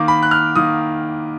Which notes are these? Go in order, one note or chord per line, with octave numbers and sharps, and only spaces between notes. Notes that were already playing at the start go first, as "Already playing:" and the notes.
Already playing: D#3 A#3 D6
B5
F#6
F6
D#3 A#3 D#6